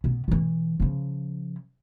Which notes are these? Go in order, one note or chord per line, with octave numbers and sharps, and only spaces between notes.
B2 B3
B2 E3
C#3 F3